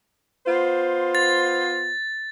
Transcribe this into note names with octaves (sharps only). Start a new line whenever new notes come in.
B3 F4 C5
A6